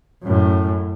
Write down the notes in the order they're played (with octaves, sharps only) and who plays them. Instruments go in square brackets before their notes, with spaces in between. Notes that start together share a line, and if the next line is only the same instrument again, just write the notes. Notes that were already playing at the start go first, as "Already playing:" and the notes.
[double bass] F#2 A2